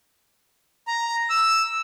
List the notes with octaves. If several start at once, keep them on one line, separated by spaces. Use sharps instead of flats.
A#5
E6